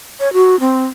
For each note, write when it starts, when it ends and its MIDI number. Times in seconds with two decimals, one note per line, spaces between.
0.20 0.32 73
0.33 0.59 66
0.60 0.84 60